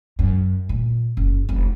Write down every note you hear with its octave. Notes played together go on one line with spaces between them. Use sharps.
F#2
A#2
F#1
F1